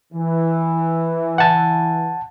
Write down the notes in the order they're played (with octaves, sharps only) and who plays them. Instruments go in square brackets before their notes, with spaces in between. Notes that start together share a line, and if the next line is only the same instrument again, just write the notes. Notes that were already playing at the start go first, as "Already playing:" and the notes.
[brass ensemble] E3
[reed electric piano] F#5 A5